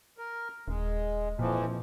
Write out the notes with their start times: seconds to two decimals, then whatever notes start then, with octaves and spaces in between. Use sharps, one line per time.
0.18 A#4
0.68 D#1 G#3
1.39 F2 A#2 E3 F3